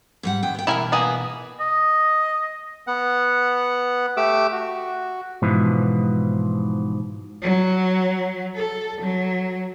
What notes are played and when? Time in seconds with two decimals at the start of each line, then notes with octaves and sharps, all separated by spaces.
0.23 G#2 G3 F#5
0.43 D#2 G5
0.55 B3 G5
0.67 B2 E3 E4 A#4 G#5
0.92 A#3 B3 G#4
1.60 D#5
2.87 B3 F#5
4.17 A3 G4 D6 E6
4.52 F#4
5.42 G#2 B2 E3 F3
7.42 F#3
8.55 A4
9.01 F#3